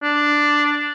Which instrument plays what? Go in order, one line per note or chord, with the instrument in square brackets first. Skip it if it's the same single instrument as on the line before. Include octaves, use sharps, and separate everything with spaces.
[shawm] D4